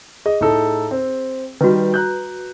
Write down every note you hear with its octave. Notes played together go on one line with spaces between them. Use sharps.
G#4 D#5
A2 D#4 A4
C4
D#3 G3 F#4 B4
A#5 F#6 G6